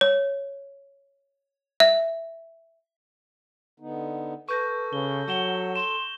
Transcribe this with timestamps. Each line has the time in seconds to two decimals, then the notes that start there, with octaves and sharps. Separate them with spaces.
0.01 C#5
1.80 E5
3.80 D3 B3 D#4
4.49 A4 B4 C#6 G6 A#6
4.93 C#3 G7
5.28 F#3 F#5 C#6 E7 G7
5.76 C6 E7